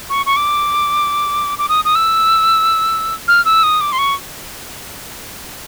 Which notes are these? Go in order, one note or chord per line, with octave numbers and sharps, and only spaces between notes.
C#6
C#6
D6
D6
D#6
D#6
E6
F6
E6
D#6
D6
C6
C#6